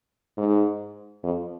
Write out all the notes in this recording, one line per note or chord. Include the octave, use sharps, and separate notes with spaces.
G#2
F2